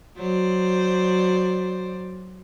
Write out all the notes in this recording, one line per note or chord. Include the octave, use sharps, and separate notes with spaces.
F#3 C5 D5